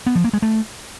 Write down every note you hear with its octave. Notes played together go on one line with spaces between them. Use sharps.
B3
F3
A#3
G#3
A3